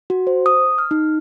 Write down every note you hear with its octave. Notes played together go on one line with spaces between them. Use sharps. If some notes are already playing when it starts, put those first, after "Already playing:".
F#4
C5
D#6
F6
D#4